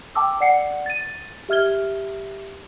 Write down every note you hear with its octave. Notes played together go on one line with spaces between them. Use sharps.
G5 A5 D6 E6
D5 F#5 C7 C#7
A6 D#7
G4 E5 F6 G#6 G7